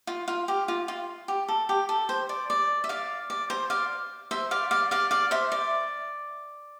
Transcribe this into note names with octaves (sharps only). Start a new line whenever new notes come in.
F4
F4
G4
F4
F4
G4
A4
G4
A4
C5
D5
D5
E5
D5 F5
D5
C5
D5 F5
C5 E5
D5 F5
D5 F5
D5 F5
D5 F5
C5 E5
D5